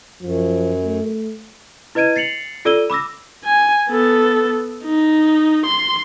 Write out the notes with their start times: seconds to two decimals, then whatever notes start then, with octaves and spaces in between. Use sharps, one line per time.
0.22 F#2 F3
0.84 A3
1.95 E4 B4 D#5 G#6 D7 D#7
2.16 A6 C7 C#7 F7 F#7
2.65 F4 A4 D5 E6 D#7 G7
2.90 B5 D6 E6 A#6
3.45 G#5
3.90 B3 A4
4.84 D#4
5.66 C6